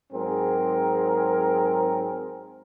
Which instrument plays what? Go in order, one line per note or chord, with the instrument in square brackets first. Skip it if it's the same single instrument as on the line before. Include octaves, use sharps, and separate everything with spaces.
[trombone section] G#2 F#3 C4 G#4 A#4